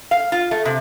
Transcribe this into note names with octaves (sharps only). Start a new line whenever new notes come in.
F5
F4
A3
C3